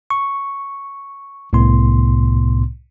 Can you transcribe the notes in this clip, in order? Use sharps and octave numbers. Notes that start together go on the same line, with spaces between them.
C#6
C2 A2 C3 B3 C6